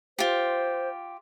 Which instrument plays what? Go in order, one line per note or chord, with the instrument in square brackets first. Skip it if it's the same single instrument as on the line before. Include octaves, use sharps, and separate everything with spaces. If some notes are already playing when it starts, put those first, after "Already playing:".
[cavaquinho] F4 G4 [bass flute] C5